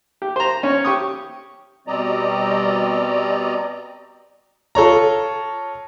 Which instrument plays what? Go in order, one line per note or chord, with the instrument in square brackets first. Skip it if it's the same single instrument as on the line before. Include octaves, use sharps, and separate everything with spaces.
[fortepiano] G4
C5 A#5
C#4
G4 C#6 D#6
[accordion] B2 G3 C4 D5 D#5 A#5
[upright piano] F4 A4 C#5 A#5